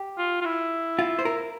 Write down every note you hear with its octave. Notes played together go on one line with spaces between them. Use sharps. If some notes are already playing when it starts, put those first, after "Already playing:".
Already playing: G4
F4
F4
E4
F4
C5
A#4